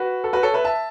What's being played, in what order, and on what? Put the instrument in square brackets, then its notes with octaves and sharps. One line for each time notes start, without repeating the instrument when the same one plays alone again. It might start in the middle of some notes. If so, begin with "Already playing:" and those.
Already playing: [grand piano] F#4 B4
A4
F#4 B4
A4 C#5
B4 E5
E5 A5